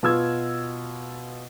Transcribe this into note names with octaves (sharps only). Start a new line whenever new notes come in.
B2 F4 E6 G#6